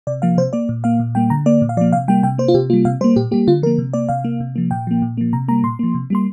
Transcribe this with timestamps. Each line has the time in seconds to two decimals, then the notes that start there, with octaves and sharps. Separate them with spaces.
0.07 C3 D5
0.22 F3 A#3 F5
0.38 C3 C5
0.53 A#3 D5
0.69 A#2
0.84 A#3 F5
1.00 A#2
1.15 G3 A#3 G5
1.30 D3 A#5
1.46 A#3 D5
1.62 A#2
1.69 F5
1.77 F3 D5
1.81 A#3
1.93 C3 F5
2.08 G3 A#3 G5
2.23 C3 G5
2.38 A#3 C5
2.48 F4
2.54 C3 G4
2.70 G3 A#3 F4
2.85 C3 F5
3.01 G3 C5
3.04 A#3
3.16 A#2 G4
3.31 G3 A#3 G4
3.47 D3 F4
3.62 F3 A#4
3.66 A#3
3.78 C3
3.93 A#3 D5
4.09 C3 F5
4.25 A#3
4.40 C3
4.56 F3 A#3
4.71 A#2 G5
4.87 F3 A#3
5.02 A#2
5.17 F3 A#3
5.33 C3 A#5
5.48 G3 A#3 A#5
5.64 A#2 C6
5.79 F3 A#3
5.95 C3
6.10 G3 A#3 C6